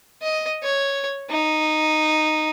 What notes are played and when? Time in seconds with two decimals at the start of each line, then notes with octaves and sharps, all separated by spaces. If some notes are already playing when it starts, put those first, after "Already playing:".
0.22 D#5
0.63 C#5
1.30 D#4